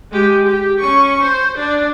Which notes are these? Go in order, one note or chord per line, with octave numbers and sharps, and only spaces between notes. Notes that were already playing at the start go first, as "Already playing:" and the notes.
G#3 G4
G4
C#4 C#6
C5
D4